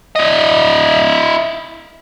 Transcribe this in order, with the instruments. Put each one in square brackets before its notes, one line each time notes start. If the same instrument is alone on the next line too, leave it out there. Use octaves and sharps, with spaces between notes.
[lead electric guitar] E4 D#5